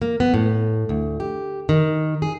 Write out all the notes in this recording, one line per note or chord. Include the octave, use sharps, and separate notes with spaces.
A#3
B3
A2
D2
G4
D#3
G#4